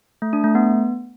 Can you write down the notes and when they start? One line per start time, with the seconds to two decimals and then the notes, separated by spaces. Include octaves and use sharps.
0.22 A3
0.33 D4
0.44 A3
0.55 B3